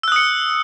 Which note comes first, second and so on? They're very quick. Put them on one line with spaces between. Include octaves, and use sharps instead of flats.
E6 F#6 D#6 C#7